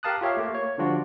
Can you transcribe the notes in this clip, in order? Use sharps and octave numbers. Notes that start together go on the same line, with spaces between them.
G4 A#4 F5 A5 D#6 F#6
F4 G4 C#5 E5 F5
A3 A#3
C#5
D3 F3 G3 D4 F4 F#4